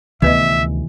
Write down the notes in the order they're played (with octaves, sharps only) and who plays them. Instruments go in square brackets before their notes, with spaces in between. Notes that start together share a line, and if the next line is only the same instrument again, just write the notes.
[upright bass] D2 [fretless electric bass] C3 D#3 E3 [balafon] B3 B4 D#5 [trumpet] E5